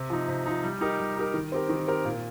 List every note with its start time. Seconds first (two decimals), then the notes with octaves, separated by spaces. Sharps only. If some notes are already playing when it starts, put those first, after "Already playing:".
Already playing: C3
0.10 F3 D#4
0.28 C3
0.46 F3 D#4
0.64 G3
0.81 D#4 G4 A#4
0.99 G3
1.16 D#4 G4 A#4
1.34 D#3
1.52 C4 G4 A#4
1.69 D#3
1.88 C4 G4 A#4
2.05 A#2